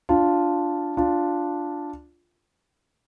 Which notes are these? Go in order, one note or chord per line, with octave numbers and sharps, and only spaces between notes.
D4 F4
D4 F4